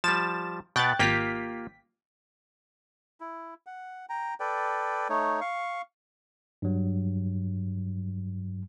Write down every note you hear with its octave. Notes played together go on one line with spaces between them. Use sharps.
F3 G3 A6 E7
B2 B3 G5 F#6 A6
G#1 A#3 F4 G4 G5 B6
E4
F#5
G5 A#5
A4 B4 D5 G5
A3 D#4 C#5
F5 C#6
G2 F#3